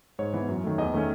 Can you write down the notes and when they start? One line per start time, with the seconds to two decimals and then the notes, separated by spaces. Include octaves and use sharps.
0.19 G#2 C#5
0.33 E3 B3
0.49 F#2
0.64 D#3 A3
0.78 E2 D#5
0.94 D#3 A3 C#4